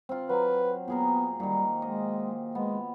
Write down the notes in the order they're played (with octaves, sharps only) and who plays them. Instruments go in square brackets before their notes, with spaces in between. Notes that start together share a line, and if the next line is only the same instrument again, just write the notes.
[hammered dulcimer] C4 F4
[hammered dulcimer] F#3 [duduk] B4
[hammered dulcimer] A#2 G#4 A#4 [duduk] B3
[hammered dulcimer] A#2 D#3 [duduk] G3
[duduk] G#3 [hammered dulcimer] D#5
[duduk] G#3 [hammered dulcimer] B3